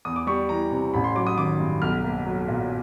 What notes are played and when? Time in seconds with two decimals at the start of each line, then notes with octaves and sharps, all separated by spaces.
0.05 E2 D#6
0.16 D6
0.27 G3 C#6
0.49 E3 A#5
0.71 C3
0.94 A1 B5
1.04 C6
1.15 F#3 D6
1.27 D#6
1.37 D#3 D6
1.59 G2
1.82 B1 F6
2.04 A#3
2.25 F#3
2.48 A#2